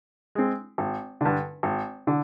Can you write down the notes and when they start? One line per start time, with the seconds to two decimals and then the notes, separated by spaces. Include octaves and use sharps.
0.35 G#3 C4
0.78 G#1
1.21 G2 D3
1.63 G#1
2.07 D3